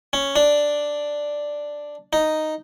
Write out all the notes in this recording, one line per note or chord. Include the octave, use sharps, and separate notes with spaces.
C#4
D4
D#4